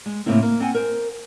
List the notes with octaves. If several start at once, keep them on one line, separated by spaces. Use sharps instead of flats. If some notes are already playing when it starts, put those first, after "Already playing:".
G#3
A2 C#3 A#3 C4 E4
A#3
C4 F#5 G#5
A#4 C5